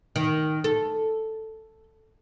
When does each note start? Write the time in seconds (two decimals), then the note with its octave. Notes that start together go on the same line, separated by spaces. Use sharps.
0.16 D#3
0.64 A4